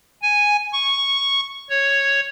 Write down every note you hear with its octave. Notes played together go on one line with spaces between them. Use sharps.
G#5
C#6
C#5